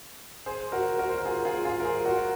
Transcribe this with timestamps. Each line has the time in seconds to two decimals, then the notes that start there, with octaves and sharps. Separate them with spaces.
0.46 G#4 C5
0.72 F#4 A#4
0.99 F#4 A#4
1.09 C5
1.18 A#4
1.25 F4 G#4
1.45 F4 G#4
1.65 F4 G#4
1.80 A#4
1.85 G#4 C5
2.05 F#4 A#4